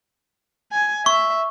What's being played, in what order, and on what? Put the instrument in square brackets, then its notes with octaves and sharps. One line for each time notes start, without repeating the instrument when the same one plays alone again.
[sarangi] G#5
[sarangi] E5 [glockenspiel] C#6